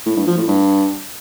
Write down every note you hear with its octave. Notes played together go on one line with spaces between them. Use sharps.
A2
G2
F3
A2
G2